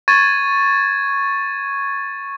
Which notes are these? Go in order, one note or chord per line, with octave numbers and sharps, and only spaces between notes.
C#6 G#6 A6 D#7